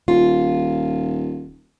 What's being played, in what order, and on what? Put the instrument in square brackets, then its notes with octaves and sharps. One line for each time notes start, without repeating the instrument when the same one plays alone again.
[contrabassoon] D#1 [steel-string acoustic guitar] F4